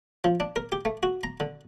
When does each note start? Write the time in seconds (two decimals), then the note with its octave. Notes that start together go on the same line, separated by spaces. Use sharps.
0.24 F3
0.40 D4
0.56 A#4
0.72 G4
0.85 A3
1.03 F#4
1.23 A#5
1.40 D3